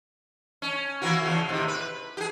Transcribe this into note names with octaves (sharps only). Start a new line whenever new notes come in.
C#4
E3 A#3 F#4
E2 C#3
A2 C3 D#3
B4
G4 G#4